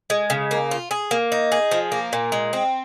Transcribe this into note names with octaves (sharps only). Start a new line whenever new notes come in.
G#3
C#3
A#3
F4
G#4
A#3
D#4
G#4
F3
A#3
A#2
G#3
C4